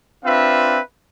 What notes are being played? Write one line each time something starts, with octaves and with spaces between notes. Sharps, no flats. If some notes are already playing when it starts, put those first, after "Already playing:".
C4 D4 F4 B4 E5 F5